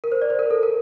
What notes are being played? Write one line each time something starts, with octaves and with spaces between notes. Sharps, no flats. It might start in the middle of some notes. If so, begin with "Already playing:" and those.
A#4
C5
D5
C5
A#4
A4
A#4